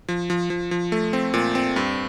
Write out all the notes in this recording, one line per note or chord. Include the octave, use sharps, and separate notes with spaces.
F3
F3
F3
F3
A3
C4
A#2
C4
G2